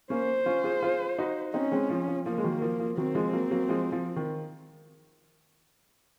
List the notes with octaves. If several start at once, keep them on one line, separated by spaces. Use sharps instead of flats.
A#3 C#4 C5
C#4 F4
F4 G#4
F4 G#4
D#4 F#4
C4 C#4 D#4
G#3 C4
F3
F3
F3 A#3
G#3
D#3 F#3
F3
F3
D#3 F#3 C4
F3 G#3
F#3 A#3
F#3 A#3
F3 G#3
F3
D#3